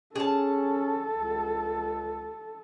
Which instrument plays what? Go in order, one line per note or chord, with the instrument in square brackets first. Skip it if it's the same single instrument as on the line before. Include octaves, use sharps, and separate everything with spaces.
[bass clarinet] C#4 [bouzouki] G#4 A5 [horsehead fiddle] A4
[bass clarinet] C#2